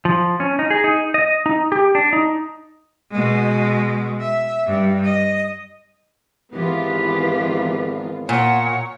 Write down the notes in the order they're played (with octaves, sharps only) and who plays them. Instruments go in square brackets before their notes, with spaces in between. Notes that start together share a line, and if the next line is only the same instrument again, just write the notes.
[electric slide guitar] F3
C#4
D#4
G#4
D#4
D#5
D#4
G4
D4
D#4
[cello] B2 G#3
E5
G2
D#5
[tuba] G#1 [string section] E3 B3 F4 [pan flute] G4
[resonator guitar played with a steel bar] A#2 [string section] C#5 [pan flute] F#5